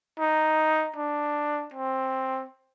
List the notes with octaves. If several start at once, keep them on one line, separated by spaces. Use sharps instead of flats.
D#4
D4
C4